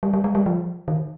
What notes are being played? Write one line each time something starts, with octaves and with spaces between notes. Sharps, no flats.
G3
G3
G#3
G3
F3
D#3